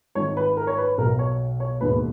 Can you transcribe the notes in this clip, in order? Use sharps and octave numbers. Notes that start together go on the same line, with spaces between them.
G#1 G#2 D#3 C#5
B4
A#4
C#5
B4
B1 B2 A#4
C#5
C#5
E1 D#2 D#3 B4